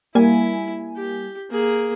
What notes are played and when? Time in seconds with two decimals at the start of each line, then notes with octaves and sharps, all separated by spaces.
0.15 G3 A#3 E4 G#5
0.97 G4
1.50 A#3 G#4